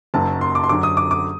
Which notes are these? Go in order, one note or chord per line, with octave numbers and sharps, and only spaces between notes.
F#1 F#2 F#3 A#3 D#4 A5
C6
D6
C6
F#2 D3 F#3 D6
D#6
D6
D6